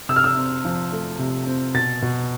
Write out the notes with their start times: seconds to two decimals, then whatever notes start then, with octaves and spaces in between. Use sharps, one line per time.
0.09 C3 E6
0.16 F6
0.24 E6
0.37 C4
0.65 F3
0.92 A3
1.19 C3
1.47 C4
1.74 B2 A6
2.02 B2